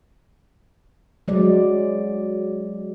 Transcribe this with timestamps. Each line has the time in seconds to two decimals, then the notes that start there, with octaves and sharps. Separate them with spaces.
1.28 F#3 G#3 D5